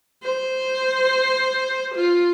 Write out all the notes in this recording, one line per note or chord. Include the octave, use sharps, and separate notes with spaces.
C5
F4